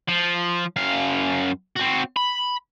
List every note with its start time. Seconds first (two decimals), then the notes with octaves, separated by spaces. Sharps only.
0.08 F3
0.76 F#2 F5
1.76 C4 F#4
2.17 B5